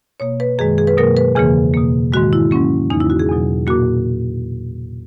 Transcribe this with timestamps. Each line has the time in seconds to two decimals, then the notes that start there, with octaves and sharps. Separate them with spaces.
0.20 B2 A#3 C#5
0.40 B4
0.59 F#2 D#3 G#3 G#4
0.78 G#4
0.87 B4
0.97 B2 F#3 A#3 A#4
1.17 B4
1.35 E2 C#3 E3 A#3 G#4
1.74 B2 A#3
2.12 G#2 D#3 G#3 F#4
2.33 E4
2.51 G#2 F#3 A#3 C#4
2.90 E2 C#3 E3 A#3 D#4
3.00 E4
3.10 F#4
3.19 G#4
3.29 E2 B2 F#3
3.67 A#2 A#3 F#4